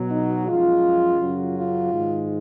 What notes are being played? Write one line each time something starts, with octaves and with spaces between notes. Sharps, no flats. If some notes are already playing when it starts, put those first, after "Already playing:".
Already playing: B2 F#3
D#4
F#2 F3 G#3 F4
F#2 C#3 F#3
F4
G#2 D#3 G#3